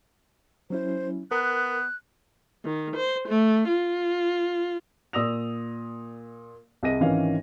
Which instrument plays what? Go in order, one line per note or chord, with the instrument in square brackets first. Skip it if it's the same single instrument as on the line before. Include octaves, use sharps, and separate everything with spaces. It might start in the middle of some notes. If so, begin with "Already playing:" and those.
[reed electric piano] F#3 C#4 E4 [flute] C5
[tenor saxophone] B3 [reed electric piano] A#4 [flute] F#6
[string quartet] D#3
C5
A3
F4
[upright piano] A#2 D5 D#6 E6 A#6 F7
C2 G#4 D#5 A#6 D#7
G#1 D#3 E3 C#4 C#5 F5